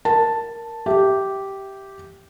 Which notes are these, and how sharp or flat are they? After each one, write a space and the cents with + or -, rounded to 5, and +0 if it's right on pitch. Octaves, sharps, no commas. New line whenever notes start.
A#4 +0 A5 +0
G4 -10 E5 +0